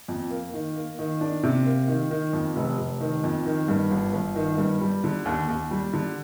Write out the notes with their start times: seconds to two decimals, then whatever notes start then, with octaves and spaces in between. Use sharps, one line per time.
0.08 F2
0.30 A#3
0.54 D#3
0.76 A#3
0.99 D#3
1.21 D4
1.43 C3
1.66 A#3
1.88 D#3
2.11 D#3
2.33 F2
2.56 F1
2.78 F1
3.01 D#3
3.24 F2
3.46 D#3
3.68 G2
3.90 G1
4.13 G1
4.36 D#3
4.58 G2
4.81 G3
5.04 D3
5.25 D#2
5.48 D#2
5.71 G3
5.93 D3